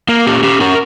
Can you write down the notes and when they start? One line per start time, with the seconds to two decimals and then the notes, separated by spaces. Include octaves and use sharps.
0.08 A#3 A#4
0.26 C#4 G4
0.43 C#4 G4
0.61 C#4 A#4